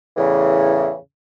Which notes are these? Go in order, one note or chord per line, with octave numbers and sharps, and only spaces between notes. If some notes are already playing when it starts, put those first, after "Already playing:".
E2 A2 C#3 E3